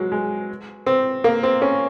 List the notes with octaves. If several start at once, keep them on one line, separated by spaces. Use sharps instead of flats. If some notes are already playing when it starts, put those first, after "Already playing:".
Already playing: F#3 G#3
G#3
C4
A#3
C4
C#4